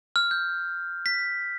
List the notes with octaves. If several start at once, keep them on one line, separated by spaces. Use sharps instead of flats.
F6
G6
B6